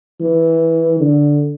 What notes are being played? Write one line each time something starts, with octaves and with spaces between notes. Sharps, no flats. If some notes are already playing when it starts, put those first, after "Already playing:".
E3
D3